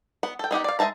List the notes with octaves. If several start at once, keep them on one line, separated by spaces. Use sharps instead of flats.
B3 F#5
A4 G5
B3 D#4 G4 F#5
D5 F5
G#3 G#4 E5 A5 A#5